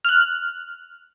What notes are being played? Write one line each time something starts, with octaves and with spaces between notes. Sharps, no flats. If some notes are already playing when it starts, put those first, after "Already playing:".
F6 F#6